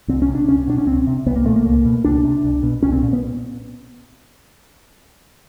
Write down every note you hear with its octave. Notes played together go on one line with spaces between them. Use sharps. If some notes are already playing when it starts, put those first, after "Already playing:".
C2 C4
C#4
C3
D4
C#2 C#4
B2 D4
C#4
C#2 C4
C3
C2 B3
A#3
A#2 A3
A#3
C#2
B2
C#2 D4
C3
C2
B2
C2 C#4
C4
A#2
B3